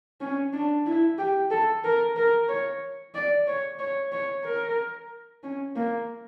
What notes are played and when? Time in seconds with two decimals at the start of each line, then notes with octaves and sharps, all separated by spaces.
0.21 C#4
0.54 D4
0.86 E4
1.18 G4
1.51 A4
1.84 A#4
2.16 A#4
2.49 C#5
3.15 D5
3.47 C#5
3.79 C#5
4.13 C#5
4.45 A#4
5.43 C#4
5.76 A#3